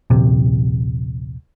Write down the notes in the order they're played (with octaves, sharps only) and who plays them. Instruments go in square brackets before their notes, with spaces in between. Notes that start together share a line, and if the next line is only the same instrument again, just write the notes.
[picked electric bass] D#1 A#1 C3